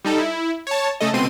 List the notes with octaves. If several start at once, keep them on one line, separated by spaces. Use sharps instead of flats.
G3 D#4 A4
E4
C#5 A5
C#3 A3 A4 D#5
C#2 B2 C4 C6 D#7